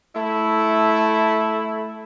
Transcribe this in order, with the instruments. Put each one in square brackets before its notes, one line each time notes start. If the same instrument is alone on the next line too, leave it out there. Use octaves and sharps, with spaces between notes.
[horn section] A3 E4